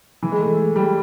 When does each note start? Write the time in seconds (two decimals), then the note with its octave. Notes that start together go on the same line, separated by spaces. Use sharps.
0.23 E3
0.32 G#3
0.40 A3
0.76 G3